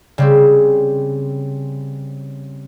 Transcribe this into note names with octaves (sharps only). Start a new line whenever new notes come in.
C#3 G3 C4